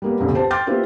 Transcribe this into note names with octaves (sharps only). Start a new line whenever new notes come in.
G3 A#3 B3
C2 F2 A#2 C#3
B3 G4 C5 A5
G5 C6 D6 F6 G6 A6
A#3 B3 E4 F4 G4 C5